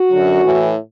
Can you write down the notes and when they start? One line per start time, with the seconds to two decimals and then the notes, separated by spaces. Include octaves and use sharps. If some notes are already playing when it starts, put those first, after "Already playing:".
Already playing: F#4
0.11 F#2 D3 F#3
0.43 A2 E3